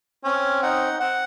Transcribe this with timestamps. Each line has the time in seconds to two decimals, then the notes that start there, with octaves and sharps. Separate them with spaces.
0.24 C4 C#4
0.63 D#4 F#5
1.00 C4 F#5